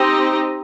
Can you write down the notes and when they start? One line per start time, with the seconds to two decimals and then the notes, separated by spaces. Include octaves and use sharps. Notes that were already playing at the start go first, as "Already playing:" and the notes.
Already playing: C4 D#4 G4 C5 D#5